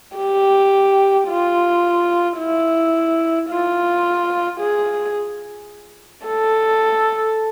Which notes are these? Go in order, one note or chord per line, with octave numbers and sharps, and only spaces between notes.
G4
F4
E4
F4
G#4
A4